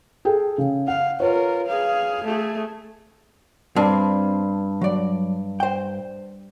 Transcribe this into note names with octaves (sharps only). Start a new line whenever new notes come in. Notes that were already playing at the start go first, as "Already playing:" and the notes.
G#4 A4 G5
C#3
F5 F#5
F4 A#4 B4 C#5
G#4 F5
A3 G#4
G2 C4
F#3 D5
C5 G5